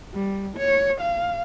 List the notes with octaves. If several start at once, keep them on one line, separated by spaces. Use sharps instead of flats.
G3
C#5
F5